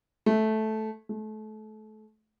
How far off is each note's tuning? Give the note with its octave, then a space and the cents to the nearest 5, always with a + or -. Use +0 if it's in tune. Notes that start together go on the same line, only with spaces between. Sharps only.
A3 -10
A3 -30